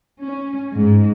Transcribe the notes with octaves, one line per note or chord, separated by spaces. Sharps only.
C#4
G#2